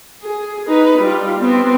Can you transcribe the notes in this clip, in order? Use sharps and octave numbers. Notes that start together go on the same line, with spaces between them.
G#4
D#4 B4
G3 F4
B3 C4